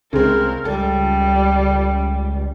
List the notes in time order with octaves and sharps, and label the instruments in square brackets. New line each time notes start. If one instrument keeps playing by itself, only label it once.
[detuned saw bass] C2 [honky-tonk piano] C#3 G#3 C4 [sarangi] A#4
[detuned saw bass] C#2 [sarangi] G3 [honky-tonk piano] A4